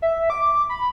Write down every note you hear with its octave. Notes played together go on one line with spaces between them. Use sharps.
E5
D6
B5